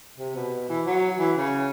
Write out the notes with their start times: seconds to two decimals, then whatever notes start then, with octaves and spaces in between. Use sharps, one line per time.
0.18 C3
0.36 B2
0.69 E3
0.86 F#3
1.19 E3
1.36 C#3